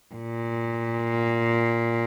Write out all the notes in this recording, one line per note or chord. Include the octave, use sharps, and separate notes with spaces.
A#2